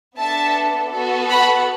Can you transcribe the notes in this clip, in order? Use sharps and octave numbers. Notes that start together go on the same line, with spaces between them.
B3 D4 A4 E5 A5
B3 F#4 A4
F#5 B5